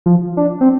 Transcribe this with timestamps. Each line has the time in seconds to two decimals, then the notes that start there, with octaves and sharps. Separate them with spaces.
0.06 F3
0.37 D4
0.61 C4